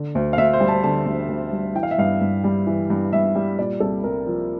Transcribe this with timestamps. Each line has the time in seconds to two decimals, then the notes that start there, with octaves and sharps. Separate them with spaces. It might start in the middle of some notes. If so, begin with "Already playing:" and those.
Already playing: D3
0.15 D2
0.33 F5
0.38 D2 E5
0.53 C5
0.60 G3
0.68 A5
0.84 D3 A5
1.06 D2
1.29 D2
1.52 G3
1.75 E3 G5
1.83 F5
1.91 E5
1.98 G2 F5
2.21 G2
2.44 G3
2.67 E3
2.90 G2
3.13 G2 E5
3.35 G3
3.58 A#2 D5
3.80 C2 A4
4.04 C2 A#4
4.26 F3